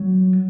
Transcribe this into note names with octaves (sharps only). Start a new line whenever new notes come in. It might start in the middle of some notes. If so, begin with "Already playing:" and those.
Already playing: F#3